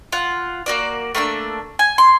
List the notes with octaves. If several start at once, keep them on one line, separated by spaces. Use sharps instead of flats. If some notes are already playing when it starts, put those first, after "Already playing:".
F4 F#5
A#3 F#4 D5
A3 A#3 D4 E6
G#5
C6